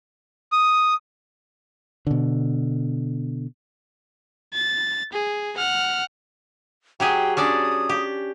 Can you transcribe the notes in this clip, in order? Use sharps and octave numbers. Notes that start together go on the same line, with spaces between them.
D#6
B2 D3
A6
G#4
F#5 F6
F#3 G4 G#4 G5
C#4 D4 D5 D#6
G4